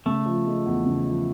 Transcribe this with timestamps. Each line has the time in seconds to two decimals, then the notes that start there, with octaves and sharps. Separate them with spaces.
0.06 C#3 A3
0.26 F3
0.46 G#3
0.66 E2
0.85 C#3
1.06 F3